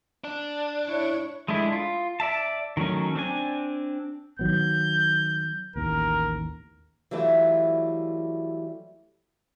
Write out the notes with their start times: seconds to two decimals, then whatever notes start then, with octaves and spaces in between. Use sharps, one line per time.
0.24 D4
0.87 E4 C#5
1.48 G#3 A3 D4 E4
1.72 F4
2.20 D5 E5 A5
2.77 D#3 F#3 A3 C#4
3.15 C4 D4 G#5
4.39 D#3 F#3 B3 G6
5.76 A1 D#2 A#4
7.11 E3 F#3 G3 A3 E4 F4